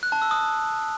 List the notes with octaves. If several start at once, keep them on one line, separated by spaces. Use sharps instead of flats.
F#6
A5
E6
D#6